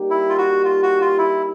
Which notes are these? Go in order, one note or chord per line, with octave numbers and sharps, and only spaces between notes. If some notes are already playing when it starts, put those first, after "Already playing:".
Already playing: G3 A#3 D#4 G4
E4
F4
F#4
F4
F#4
F4
E4